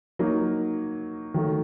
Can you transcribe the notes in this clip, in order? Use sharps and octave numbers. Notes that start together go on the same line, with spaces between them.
F#3 A#3 D#4
D#3 F#3 A3